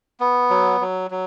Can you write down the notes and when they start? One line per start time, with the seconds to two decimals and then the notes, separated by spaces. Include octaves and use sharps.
0.20 B3
0.50 F#3
0.81 F#3
1.11 F#3